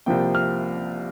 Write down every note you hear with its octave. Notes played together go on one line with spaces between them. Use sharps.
C2 C3 F3 A#3 G5
F6